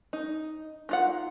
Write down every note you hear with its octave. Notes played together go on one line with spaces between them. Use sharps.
D#4
D#4 F4 F#5